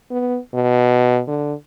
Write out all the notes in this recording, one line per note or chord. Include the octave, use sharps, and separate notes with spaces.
B3
B2
D3